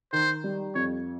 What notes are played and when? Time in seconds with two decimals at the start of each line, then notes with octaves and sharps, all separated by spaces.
0.12 D#3 C5
0.44 G3
0.75 F2 C#5